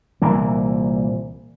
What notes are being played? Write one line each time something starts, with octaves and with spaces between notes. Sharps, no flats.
C2 A#2 E3 A#3